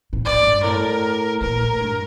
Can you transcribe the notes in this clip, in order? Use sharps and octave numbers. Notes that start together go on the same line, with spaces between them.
A2
D5
G2
A2 A#4
A#2 A#4
A2
G2